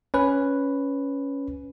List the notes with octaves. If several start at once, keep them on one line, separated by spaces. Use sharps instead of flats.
C#4 B4